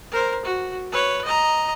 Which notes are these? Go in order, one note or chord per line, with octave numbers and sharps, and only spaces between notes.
A#4 C5
F#4
B4 C#5
D#5 A#5